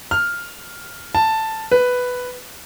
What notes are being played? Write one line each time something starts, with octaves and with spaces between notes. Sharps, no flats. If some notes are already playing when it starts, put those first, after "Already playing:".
F6
A5
B4